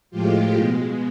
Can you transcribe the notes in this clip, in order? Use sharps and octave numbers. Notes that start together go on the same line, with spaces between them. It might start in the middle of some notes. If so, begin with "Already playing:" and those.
A2 F3 G#3 F4 G4
B2 G#3